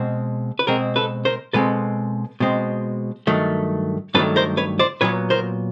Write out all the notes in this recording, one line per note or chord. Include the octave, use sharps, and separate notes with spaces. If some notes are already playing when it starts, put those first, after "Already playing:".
Already playing: B2 G#3 C4
B4
B2 G#3 C4 G#4 A#4
A4 B4
A#4 C5
B2 G#3 C4 A4 B4
B2 G#3 C4
G2 D#3 F#3 A3
G2 D#3 F#3 A3 A4 B4
A#4 C5
B4 C#5
C5 D5
A#2 F#3 B3 B4 C#5
A#4 C5